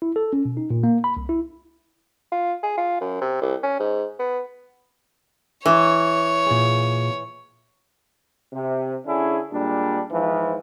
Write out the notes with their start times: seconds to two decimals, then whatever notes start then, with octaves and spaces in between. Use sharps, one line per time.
0.02 E4
0.16 A4
0.33 C#4
0.45 B2
0.57 D#4
0.70 A#2
0.83 A#3
1.04 B5
1.17 C2
1.29 E4
2.32 F4
2.63 G#4
2.78 F4
3.01 F#2
3.21 C3
3.42 C2
3.63 C#4
3.80 G#2
4.19 B3
5.66 E3 C#5
6.47 A#2 G#4
8.53 C3
9.06 D3 C#4 D4 E4 G#4
9.52 A#2 G3 G#3 D4
10.11 G#2 E3 F3